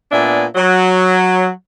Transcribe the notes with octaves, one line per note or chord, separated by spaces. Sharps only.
A#2 B3 D4 E5 G#5
F#3